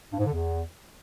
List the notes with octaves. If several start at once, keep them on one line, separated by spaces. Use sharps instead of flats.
G2
G#2
D3
E2